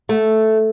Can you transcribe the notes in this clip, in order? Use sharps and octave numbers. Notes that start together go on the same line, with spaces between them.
A3